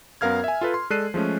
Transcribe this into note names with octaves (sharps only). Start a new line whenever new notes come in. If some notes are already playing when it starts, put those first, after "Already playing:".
F#2 B3 A#4 F5 F6 G#6
E5 G#5
F4 A4 B4
C6
G#3 A4 D5 F#6 C7 D#7
F3 G#3 A3 C#4